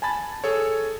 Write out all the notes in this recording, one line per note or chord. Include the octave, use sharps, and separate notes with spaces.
G#5 A5 B5 A6
G#4 A4 C#5